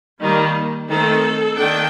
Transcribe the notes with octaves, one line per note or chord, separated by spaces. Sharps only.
D#3 G3 A#3
D#3 A3 C4 A4
D#3 A#3 D4 G5